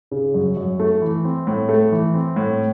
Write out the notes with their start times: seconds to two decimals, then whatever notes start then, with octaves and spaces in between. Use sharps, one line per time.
0.11 C#3
0.34 F#2
0.57 F#2
0.80 A3
1.02 E3
1.24 C4
1.47 A2
1.69 A3
1.92 E3
2.14 C4
2.36 A2